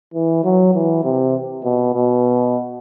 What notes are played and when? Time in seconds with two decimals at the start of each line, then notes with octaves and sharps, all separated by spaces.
0.14 E3
0.44 F#3
0.74 E3
1.04 C3
1.64 B2
1.94 B2